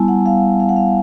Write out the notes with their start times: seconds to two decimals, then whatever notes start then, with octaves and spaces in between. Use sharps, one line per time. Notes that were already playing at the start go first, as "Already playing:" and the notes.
Already playing: G3 B3 E4 G#5 A5
0.08 F#5
0.26 F5
0.60 F5
0.69 F#5
0.76 F5